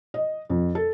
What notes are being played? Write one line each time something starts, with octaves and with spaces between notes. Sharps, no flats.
D#5
F2
A4